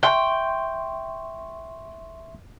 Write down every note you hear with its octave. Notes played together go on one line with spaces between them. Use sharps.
E5 G5 C6 C#6